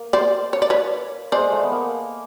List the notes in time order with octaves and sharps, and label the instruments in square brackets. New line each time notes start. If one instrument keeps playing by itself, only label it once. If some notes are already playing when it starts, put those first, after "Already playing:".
Already playing: [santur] A#3
[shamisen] C5 D5
C#5
D5
B4 C#5
[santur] G#3 [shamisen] C5 D5
[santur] A3
B3
A#3